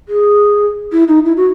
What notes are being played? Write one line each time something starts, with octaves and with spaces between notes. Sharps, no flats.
G#4
E4
D#4
E4
F#4